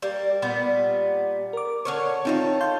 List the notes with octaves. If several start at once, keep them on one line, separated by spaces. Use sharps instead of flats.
G3 A#3
A#2 G3 B3
A#4 D6
D3 C#4 C#5 C#6
D#3 C4 D#4 F4 A4 C#5
F5 C6 G6